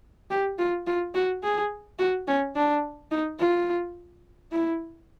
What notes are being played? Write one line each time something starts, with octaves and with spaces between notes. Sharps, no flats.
G4
F4
F4
F#4
G#4
F#4
C#4
D4
D#4
F4
E4